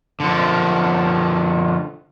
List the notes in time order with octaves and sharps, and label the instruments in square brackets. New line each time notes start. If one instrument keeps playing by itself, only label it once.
[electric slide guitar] D3 F3